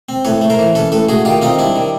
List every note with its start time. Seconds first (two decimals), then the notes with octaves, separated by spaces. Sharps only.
0.09 C4
0.25 A2 B4 C#5
0.41 A3
0.50 A#4 C5
0.59 E3
0.75 C#4 A4 B4
0.92 A2 A4 B4
1.09 A3 F#4 G#4
1.25 D#3 F4 G4
1.42 C4 D#4 F4
1.59 G3 D4 E4
1.76 D#3